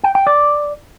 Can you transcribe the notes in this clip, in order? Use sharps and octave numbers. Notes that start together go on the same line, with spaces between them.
G5
G5
D5